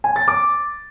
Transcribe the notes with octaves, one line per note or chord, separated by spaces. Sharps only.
G#5
A6
D6